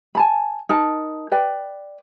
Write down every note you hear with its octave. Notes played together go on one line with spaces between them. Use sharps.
G#5 A5 B5
D#4 A#4 A5
B4 D5 G5